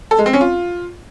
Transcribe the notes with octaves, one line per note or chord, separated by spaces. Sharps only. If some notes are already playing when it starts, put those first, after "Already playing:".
A4
G#3
C4
C#4
F4